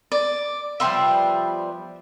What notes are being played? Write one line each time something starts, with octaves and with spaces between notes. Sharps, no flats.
D5
F3 G3 B3 E5 C6